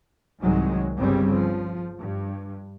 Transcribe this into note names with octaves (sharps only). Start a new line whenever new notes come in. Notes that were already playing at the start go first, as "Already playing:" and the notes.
C2 G#2 D#3 F#3 G#3
G1 G2 C#3 G3 C4
F3
G2